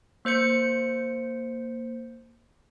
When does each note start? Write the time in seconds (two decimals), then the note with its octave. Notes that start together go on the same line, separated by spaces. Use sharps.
0.25 A#3 C5 G6 C#7